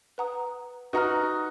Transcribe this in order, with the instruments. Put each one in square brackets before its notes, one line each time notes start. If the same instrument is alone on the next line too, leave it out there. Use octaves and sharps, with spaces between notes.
[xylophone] B4 F#5 A#5 D#6
[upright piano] D#4 F#4 [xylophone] B4 F#5 A#5 F6